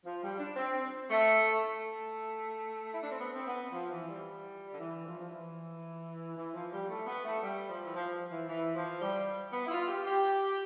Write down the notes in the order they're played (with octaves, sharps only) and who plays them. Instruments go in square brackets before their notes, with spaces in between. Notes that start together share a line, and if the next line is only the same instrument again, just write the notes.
[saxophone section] F3
G3
D4
C4
A3
A3
E4
D4
C4
B3
C4
B3
F3
E3
G3
D3
E3
F3
F3
E3
E3
F3
G3
A3
B3
A3
G3
F3
E3
F3
E3
E3
F3
G3
B3
E4
F4
G4
G4